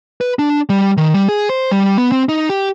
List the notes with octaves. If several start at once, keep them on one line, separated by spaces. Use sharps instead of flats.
B4
D4
G3
D#3
G3
G#4
C5
G3
B3
C4
D#4
G4